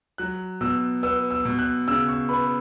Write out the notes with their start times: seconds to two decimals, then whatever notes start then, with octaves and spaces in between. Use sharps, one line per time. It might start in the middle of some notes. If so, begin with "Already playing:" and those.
0.18 F#3 F#6
0.61 B2 E6
1.03 B3 E6
1.31 E6
1.45 B2
1.59 F#6
1.88 C#3 E6
2.08 C#6
2.29 B3 B5